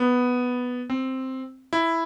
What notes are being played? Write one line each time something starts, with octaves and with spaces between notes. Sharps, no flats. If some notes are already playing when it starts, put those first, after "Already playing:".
Already playing: B3
C4
E4